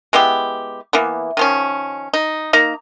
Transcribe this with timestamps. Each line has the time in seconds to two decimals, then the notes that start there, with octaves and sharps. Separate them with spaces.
0.13 G#3 B3 E4 G4
0.93 E3 A#3 B3
1.37 D#3 F3 C#4
2.14 D#4
2.53 A#3 D#4 A#5